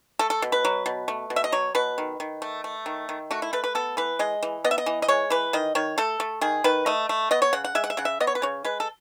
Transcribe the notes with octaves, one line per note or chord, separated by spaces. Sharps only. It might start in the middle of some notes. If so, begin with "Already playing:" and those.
A3 A4
A4
B2
B4
F#3
B2
A3
B2
E5
D#5
F#3 C#5
B2 B4
D#3
D#3
A3
A3
D#3
D#3
A3 F#4
E4
A3 B4
B4
B3 A4
E3 B4
G#3 D#5
E3
B3 D#5
E5
D#5
E3
D#5
G#3 C#5
E3 B4
D#3 D#5
D#3 C#5
A3 A4
A3
D#3 G#4
D#3 B4
A3 D#5
A3
B3 D#5
C#5
C#3 F#5
F#5
G#3 E5
F#5
E5
C#3 F#5
E5
B3 D#5
C#5
B4
C#3 C#5
G#3 B4
A4